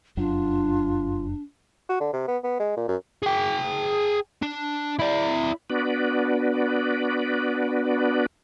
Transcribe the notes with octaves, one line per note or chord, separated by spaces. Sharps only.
F1 F#2 F#3 D4 F4
F#4
D3
C3
B3
B3
G#3
A#2
F#2
G#4 G5
D4
E4 D5
B3 D4 F#4 B4 D5